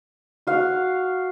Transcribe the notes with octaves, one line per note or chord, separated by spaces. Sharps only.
F#4 F5